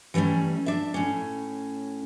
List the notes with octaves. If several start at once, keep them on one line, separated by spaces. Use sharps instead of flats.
E3 F#3 G3 A3 C#4
D4 E5
A2 C#4